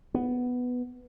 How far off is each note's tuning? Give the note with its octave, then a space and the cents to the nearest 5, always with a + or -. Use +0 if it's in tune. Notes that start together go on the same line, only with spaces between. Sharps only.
B3 +5